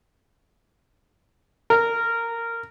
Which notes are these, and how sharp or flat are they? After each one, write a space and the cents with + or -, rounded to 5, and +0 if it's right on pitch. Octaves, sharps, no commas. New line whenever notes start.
A#4 -15